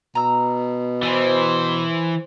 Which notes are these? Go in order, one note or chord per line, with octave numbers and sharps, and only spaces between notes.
B2 A#5 E6
E3 C5 D5 G#5 B5